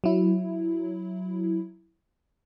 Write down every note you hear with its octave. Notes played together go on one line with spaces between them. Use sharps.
F#3 E4